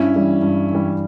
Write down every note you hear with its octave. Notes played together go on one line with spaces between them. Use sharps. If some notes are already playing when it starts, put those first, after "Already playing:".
Already playing: G2 C#4 E4
E3 G3
G2
E3 G3